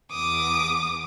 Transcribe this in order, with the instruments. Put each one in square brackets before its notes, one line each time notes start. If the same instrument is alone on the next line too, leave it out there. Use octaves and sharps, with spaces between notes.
[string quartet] E2 D6 D#6